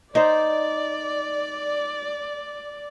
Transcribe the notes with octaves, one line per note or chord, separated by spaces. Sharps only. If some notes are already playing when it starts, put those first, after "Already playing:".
D#4 C5 D5